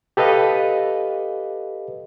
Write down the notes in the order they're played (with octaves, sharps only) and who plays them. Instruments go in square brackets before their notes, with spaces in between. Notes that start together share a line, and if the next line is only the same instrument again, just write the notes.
[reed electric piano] G4 A4 B4 D#5 F5